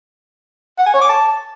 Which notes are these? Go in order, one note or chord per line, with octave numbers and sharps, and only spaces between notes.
F#5
G#5
C#5
D6
A5